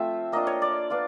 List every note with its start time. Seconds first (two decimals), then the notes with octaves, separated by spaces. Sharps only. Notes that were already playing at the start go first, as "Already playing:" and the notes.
Already playing: F3 A3 C4 F4 E5
0.32 A#3 D4 F4 D#5
0.47 C#5
0.62 D5
0.90 B3 D4 F4